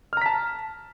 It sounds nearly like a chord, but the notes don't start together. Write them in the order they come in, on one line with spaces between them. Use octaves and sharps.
F6 A#5 B6 A5